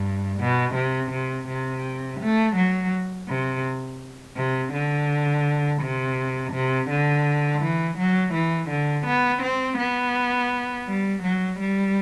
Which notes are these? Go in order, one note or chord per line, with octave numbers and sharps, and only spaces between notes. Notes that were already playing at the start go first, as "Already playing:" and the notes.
Already playing: G2
B2
C3
C3
C3
A3
F#3
C3
C3
D3
C3
C3
D3
E3
F#3
E3
D3
B3
C4
B3
G3
F#3
G3